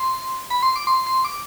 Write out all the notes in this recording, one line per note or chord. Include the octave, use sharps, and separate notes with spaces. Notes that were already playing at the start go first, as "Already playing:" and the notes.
Already playing: C6
B5
C6
D6
C6
C6
D6